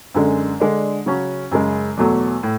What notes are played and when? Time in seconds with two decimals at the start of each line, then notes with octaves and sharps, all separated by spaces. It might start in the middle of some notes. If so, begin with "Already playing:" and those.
0.14 F#2 D3 G#3
0.60 D3 G#3 D4
1.06 C#3 F#3 C#4 F#4
1.51 F#2 C#3 G#3
1.97 E2 B2 F#3 A3
2.43 A2